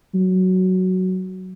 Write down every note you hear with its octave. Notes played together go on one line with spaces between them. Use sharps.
F#3